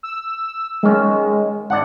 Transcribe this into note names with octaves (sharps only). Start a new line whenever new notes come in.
E6
D#3 G#3 C#4
G#1 D4 F#5